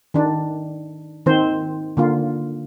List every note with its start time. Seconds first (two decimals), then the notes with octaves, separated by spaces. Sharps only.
0.14 D#3 D4
1.26 D#3 C4 C5
1.97 D3 A#3 F4